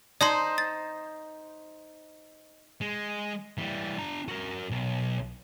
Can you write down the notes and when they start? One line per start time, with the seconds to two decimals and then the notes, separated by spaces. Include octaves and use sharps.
0.21 D#4 C5 D5 A5 C6
0.58 A6
2.81 G#3
3.58 E3 G3
3.98 D4 A#5
4.28 F#4 A#4
4.70 B1